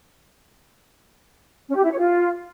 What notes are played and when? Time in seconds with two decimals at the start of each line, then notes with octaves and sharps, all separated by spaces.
1.69 C#4
1.76 G4
1.84 E4
1.91 C#5
1.98 F4